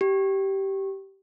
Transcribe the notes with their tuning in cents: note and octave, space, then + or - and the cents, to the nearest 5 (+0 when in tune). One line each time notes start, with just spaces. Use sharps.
G4 -15